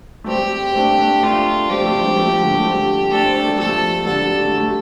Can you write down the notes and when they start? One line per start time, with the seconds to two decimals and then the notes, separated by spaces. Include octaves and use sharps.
0.24 A3
0.28 G3 C4 G4
0.71 C4
0.76 A3 D4
0.98 A3 D4
1.23 A3 D4 F4
1.70 G3 C4 G4
1.81 F3 A3
1.93 F3 A3
2.00 D4
2.05 G3 C4
2.16 F3 A3
2.41 D3 G3
2.55 A3
2.64 G3 C4
3.11 A3 D4 A4
3.25 C4
3.35 A3 D4
3.48 G3
3.59 F3 A3 A4
3.99 A3
4.06 D3 G3 A4
4.29 G3
4.39 A3
4.48 G3
4.58 A3